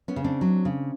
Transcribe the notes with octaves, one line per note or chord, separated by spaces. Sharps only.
B3 C#4
C#3
C4 D4
F#3
C#3